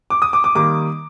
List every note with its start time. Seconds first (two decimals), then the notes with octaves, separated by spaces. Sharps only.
0.10 D6
0.22 D#6
0.33 D6
0.44 D6
0.55 D#3 G3 A#3 D6